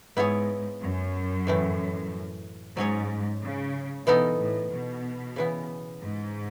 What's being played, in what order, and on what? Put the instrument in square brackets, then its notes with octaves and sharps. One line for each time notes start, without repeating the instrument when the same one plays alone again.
[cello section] G#2 [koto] B3 E4 G#4 C#5
[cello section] F#2
[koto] A2 E3 A3
[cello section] G#2 [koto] F#3 C#4 G#4 C#5
[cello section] C#3
[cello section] B2 [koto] E3 B3 D#4 A4
[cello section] A2
B2
[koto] C#3 E3 B3
[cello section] G#2